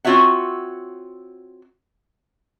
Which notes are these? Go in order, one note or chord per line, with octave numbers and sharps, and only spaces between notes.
C4 F4 F#4 C#5 E5 F#5